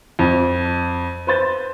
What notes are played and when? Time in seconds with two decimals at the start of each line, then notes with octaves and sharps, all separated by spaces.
0.19 F2
1.27 B4 C5 A6